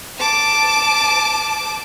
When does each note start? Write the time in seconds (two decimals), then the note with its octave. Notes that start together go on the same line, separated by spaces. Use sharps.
0.19 A5 D6